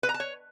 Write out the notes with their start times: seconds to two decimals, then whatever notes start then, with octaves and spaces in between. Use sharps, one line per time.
0.03 B4
0.09 A#5
0.14 A5
0.20 C#5